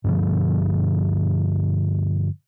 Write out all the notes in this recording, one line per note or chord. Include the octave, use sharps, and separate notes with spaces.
G2 B2 D3 F3